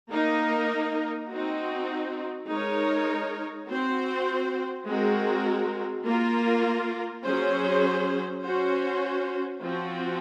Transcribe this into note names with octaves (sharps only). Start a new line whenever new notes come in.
A#3 D#4 A#4
C4 D#4 F#4
G#3 D#4 A#4 C#5
C4 F#4 C5
G#3 C4 F#4 A#4
A#3 F4 A#4
F#3 C#4 G#4 C5
C#4 F#4 C5
F3 C4 F#4